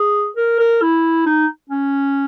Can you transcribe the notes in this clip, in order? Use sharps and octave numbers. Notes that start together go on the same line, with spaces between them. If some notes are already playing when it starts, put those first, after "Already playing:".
Already playing: G#4
A#4
A#4
E4
D#4
C#4